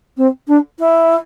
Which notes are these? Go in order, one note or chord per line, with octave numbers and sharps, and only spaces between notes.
C4
D4
E4